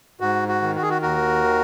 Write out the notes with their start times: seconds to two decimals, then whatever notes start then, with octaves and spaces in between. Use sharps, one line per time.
0.20 G#2 F#4
0.48 F#4
0.62 D#3
0.76 F#4
0.82 G#4
0.90 F#4
1.02 D#2 F#4 A#4
1.44 D#3